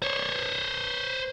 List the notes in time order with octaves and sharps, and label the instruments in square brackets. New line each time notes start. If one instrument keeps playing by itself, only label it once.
[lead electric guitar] C5 C#5